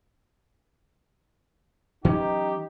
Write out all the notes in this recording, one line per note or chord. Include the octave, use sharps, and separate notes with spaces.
E3 F#3 C#4 D#4 G4